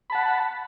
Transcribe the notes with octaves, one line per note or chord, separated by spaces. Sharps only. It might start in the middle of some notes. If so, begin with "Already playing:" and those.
F#5 A5 B5